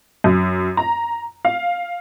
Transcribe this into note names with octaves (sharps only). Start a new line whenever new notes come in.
F#2
A#5
F5